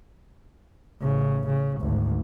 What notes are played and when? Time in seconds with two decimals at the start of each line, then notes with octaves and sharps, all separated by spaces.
1.01 A1 C#3
1.47 C#3
1.80 G#1 D2